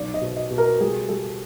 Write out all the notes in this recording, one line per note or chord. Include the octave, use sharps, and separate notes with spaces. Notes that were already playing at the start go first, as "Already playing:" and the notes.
Already playing: B1 D5
D#5
B2
D#5
B2
A#4
G3 G#4
G3 A4